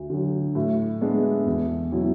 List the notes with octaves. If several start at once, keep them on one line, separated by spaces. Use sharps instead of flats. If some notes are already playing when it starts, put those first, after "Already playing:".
Already playing: D2
D3 F#3
A2
G#3 B3 D4
E2
B2 F#3 C#4 E4